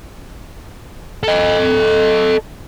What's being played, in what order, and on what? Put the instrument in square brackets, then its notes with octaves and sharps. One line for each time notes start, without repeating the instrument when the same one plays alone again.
[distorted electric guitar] A4 D#5